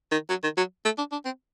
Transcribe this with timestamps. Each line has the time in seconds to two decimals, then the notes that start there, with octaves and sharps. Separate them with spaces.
0.11 D#3
0.29 F#3
0.43 D#3
0.57 F#3
0.85 A3
0.98 D4
1.12 D4
1.25 C4